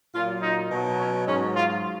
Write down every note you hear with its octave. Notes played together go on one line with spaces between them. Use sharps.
A#2 F#3 F4
D#4
B2 F#3
C#4
G#2 F#3 C#4
F4